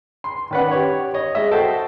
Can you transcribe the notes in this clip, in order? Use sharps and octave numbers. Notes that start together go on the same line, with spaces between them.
C6
D#3 C#4 B4 D5 F#5
G4 C#5
C#5 D#5
G#3 D#5 E5
F#4 A4 C5 G5 A5